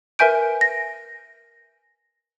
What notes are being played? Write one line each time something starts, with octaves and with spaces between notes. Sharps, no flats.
A#4 B4 E5 G#5 G6 D7
A#6